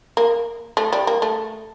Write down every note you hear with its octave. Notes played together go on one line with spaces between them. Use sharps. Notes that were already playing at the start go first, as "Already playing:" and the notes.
A#3
A3
G3
A#3
A3